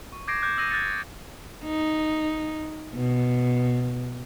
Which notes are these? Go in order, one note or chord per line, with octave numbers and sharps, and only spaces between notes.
C#6
D6 G6 G#6 A#6 C7 D7
D6 F#6 G6 C7 C#7
D#6 E6 G6 A#6 D#7
F#6 G#6 A6 C#7
D#4
B2